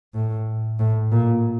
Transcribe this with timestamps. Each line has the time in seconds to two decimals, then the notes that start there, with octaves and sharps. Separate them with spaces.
0.14 A2
0.79 A2
1.12 A#2